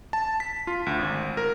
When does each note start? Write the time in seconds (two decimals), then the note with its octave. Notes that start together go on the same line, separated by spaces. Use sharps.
0.13 A5
0.40 B6
0.67 F4
0.86 D2
0.99 G#1
1.37 A#4